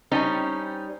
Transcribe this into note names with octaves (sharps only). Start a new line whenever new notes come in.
G3 C4 C#4 D#4